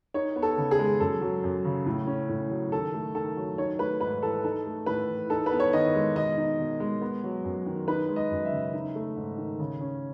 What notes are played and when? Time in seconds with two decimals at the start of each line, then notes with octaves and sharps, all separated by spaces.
0.14 D#4 C#5
0.36 B3
0.42 A4
0.57 C#3
0.71 G#4
0.79 G#3
1.00 F#2 A4
1.21 F#3
1.44 F#2
1.65 C#3
1.86 A2
2.07 C#4
2.29 A2
2.50 F#3
2.72 D#3 A4
2.93 A3
3.15 D#3 A4
3.37 F#3
3.58 D#4 C#5
3.79 A3 B4
4.01 G#2 B4
4.22 E3 A4
4.44 D#4 A4
4.66 A3
4.86 A2 B4
5.09 E3
5.30 D#4 A4
5.46 B4
5.51 B3
5.60 C#5
5.73 D#3 D#5
5.94 G#3
6.15 B2 D#5
6.37 D#4
6.59 B2
6.80 G#3
7.01 B3
7.23 F#3
7.44 F#2
7.66 D#3
7.88 D#4 B4
8.09 G#3
8.16 D#5
8.31 F#2
8.45 E5
8.52 C#3
8.73 D#4
8.95 A3
9.16 G#2
9.38 D#3
9.59 C#3
9.81 C#4